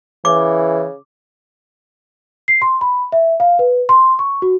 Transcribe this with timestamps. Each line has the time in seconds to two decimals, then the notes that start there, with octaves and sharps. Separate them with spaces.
0.25 C#3 E3 D6
2.48 C7
2.62 C6
2.81 B5
3.12 E5
3.40 F5
3.59 B4
3.89 C6
4.19 C#6
4.42 F#4